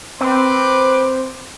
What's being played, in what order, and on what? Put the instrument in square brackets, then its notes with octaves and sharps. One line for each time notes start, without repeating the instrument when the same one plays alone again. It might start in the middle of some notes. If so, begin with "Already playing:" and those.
[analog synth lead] C4 [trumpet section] B4 C6 D6